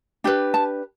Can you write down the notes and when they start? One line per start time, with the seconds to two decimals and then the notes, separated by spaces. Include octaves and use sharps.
0.24 D4 G4 B4
0.54 A5